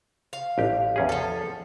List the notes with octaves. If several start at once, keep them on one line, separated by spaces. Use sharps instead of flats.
F5
A1 G4
E2 C#4 G#4
F3 A4